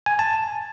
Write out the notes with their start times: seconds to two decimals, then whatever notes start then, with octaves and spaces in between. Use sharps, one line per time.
0.06 G#5
0.19 A5